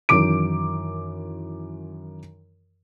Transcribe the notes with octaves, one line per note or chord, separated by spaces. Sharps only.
F#2 D#3 E3 D6 D7